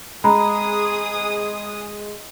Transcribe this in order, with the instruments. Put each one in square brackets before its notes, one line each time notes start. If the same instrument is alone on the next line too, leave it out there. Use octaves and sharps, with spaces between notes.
[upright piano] G#3 [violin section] G#4 D#6 [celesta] A#5 B5